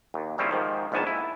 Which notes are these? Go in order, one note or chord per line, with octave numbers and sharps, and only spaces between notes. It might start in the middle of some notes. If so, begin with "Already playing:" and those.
D#2
C#3 G3 C4 C#4 E4 F4
G#2 D#3 F3
A#1 G#2 D#3 B3 G#5 A5
E4